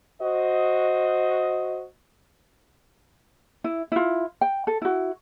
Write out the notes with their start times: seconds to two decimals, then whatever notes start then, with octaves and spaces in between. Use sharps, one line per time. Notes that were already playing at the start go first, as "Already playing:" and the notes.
0.22 F#4 C5 D#5
3.64 E4
3.92 E4 F4
4.41 G5
4.67 A4
4.82 E4 F#4